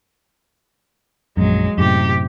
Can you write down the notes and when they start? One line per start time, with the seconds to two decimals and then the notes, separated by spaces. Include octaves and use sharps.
1.37 A#1 F#2 F#3 G#3
1.78 F#2 A2 C3 G4